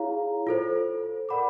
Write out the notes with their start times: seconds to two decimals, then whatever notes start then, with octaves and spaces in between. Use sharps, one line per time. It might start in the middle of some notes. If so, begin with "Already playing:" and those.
Already playing: E4 G#4 C#5 F5 A#5
0.47 F4 A4 C5
1.29 A#4 D5 F#5 B5 D6